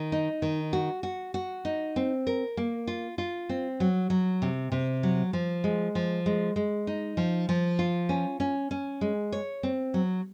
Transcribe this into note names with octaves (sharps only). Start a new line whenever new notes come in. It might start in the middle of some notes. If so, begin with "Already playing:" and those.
Already playing: D#3
D#4
D#3
F#4
F#4
F#4
D#4
C4
A#4
A#3
F4
F4
C4
F#3
F#3
C3
C3
F#3
F3
G#3
F3
G#3
G#3
D#4
F3
F3
F4
C#4
C#4
C#4
G#3
C#5
C4
F#3